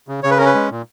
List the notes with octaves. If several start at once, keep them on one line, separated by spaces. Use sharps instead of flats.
C#3
C#3 C#5
B4
C#4 A#4
B4
G#3
A#2